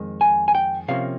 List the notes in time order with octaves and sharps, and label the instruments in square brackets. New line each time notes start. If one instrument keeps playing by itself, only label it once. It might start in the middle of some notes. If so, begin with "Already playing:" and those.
Already playing: [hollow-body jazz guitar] F2 D#3 G#3
G#5
G#5
G5
C3 F3 A#3 C#4 F5